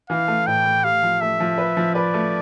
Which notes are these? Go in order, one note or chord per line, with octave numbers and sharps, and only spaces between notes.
E3 F5
A3
A2 G5
A3
G4 F5
F3
A3 E5
F3
B4
F3
B4 D5
A3